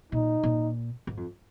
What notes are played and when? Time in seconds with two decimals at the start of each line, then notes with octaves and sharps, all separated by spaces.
0.12 A#2 D#4
0.43 A#2
1.07 G#2
1.17 F2